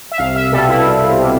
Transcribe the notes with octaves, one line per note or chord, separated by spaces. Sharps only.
E5
C2 F5
E5
B2 G3 A4
E4
C2
C4
B2 G3